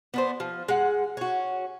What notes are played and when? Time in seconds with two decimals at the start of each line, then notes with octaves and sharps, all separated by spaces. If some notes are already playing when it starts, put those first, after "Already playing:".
0.14 B3 D4 C5
0.40 F3
0.69 G#3 F#5
1.17 C#4 F#4